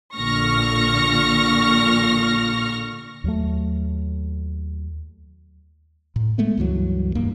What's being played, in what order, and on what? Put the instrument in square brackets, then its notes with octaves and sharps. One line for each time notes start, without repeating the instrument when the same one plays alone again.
[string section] A#1 A#2 D3 C#6 F6 A#6
[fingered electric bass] D#2 F#3 A3
A2
G#3 A3 B3
C#2 G2 E3 F#3
D#1 G2 A#3